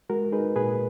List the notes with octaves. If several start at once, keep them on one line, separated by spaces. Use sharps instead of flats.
G#3 F#4 A#4
D#4 G#4 B4
A#2 G#4 B4